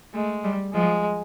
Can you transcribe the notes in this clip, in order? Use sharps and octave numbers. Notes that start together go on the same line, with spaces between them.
G#3 A3
G3
F3 G#3